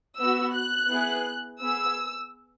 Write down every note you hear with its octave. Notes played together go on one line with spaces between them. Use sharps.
B3 F#4 E6
F#6
B3 E4 G#4
B3 G#4 E6